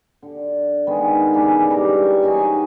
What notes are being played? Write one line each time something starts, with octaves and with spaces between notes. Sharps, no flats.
D3
D#3 G#3 B3
C#3 E3 D4 F5
G3 G4 A#5 D6
C#6
D#4 F#4 C#5 G#5